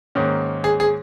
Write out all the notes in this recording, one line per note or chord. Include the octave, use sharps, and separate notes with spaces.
G#2 D#3 A#3 C#4
G#4
G#4